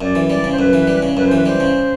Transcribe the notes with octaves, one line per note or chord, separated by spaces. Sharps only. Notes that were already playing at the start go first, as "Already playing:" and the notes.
F#2 D5
E3
G3 D5
C#3
C5
F#2 B4
E3
G3
C#3
F#2 B4
C5
E3 B4
G3 C5
C#3